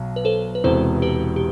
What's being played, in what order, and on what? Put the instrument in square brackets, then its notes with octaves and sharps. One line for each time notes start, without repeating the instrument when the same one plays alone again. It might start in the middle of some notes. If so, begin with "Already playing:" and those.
Already playing: [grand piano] B1 B2 F#3
[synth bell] B4
A4 C5
B4
[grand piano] E1 E2 C3 [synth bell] A4 C5
[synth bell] G4 B4
G4